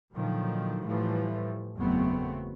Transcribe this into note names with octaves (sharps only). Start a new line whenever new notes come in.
A#2 D3 D#3 F3 F#3
A2 E3 F3 G3 A3
F#1 E2 F#3 A3 B3 C4